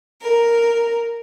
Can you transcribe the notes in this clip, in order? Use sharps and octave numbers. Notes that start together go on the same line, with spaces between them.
A#4